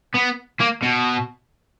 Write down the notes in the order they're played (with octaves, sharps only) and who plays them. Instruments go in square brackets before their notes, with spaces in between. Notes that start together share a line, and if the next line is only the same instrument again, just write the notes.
[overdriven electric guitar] B3
A#3
B2